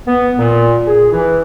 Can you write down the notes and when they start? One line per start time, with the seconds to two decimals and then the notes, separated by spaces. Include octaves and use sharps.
0.07 B3
0.38 A#2
0.87 G#4
1.12 E3